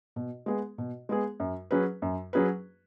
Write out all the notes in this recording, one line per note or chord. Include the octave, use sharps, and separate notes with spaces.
B2
G#3 B3 G#4
B2
G#3 B3 G#4
F#2
F#3 C#4 G#4 B4
F#2
F#3 C#4 G#4 B4